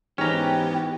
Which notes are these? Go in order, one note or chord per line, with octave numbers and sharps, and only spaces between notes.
G#2 E3 B3 C#4 G4 A#5